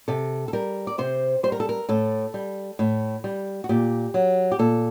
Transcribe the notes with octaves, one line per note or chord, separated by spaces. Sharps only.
C3 A4
A4
G3 A#4
D5
C3 C5
G3 C5
A#4
A4
A#4
A2 A4
G3
A2
G3
F#4
A#2 G4
F#3
G4
A#2 A4